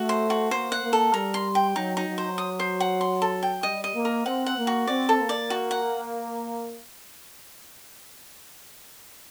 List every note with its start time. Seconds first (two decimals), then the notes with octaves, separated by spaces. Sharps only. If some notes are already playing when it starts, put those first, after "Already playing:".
Already playing: A3 F#4
0.09 C5
0.30 F#4
0.51 A#3 C5
0.72 F#5
0.83 A#3
0.93 A4
1.13 G3 A#4
1.34 C6
1.55 G5
1.75 F#3 D#4
1.97 D#4
2.07 F#3
2.18 C5
2.38 D#6
2.59 C5
2.80 F#5
3.01 C6
3.22 A4
3.43 G5
3.63 G3 D#5
3.84 D#5
3.95 A#3
4.05 A#4
4.26 C4 F#5
4.46 F#5
4.57 A#3
4.67 F#4
4.87 C4 D5
5.09 A4
5.19 A#3
5.29 D5
5.50 F#4
5.71 F#5